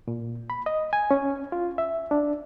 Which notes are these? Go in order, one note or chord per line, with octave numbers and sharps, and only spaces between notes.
A#2
B5
D#5
G#5
C#4
F4
E5
D4